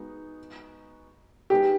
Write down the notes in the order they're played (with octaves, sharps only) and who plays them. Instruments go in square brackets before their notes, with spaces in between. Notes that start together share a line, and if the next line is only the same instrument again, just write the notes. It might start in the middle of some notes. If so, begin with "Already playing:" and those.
Already playing: [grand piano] G#3 B3 D#4 F#4
[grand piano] G#3 B3 D#4 G#4 B4 [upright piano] G4